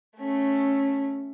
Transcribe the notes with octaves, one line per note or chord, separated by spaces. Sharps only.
A3 C#4